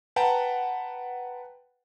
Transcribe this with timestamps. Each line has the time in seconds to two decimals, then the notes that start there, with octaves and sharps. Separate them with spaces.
0.16 B4 F#5 G5 A5 A#5